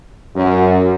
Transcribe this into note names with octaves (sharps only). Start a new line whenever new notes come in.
F#2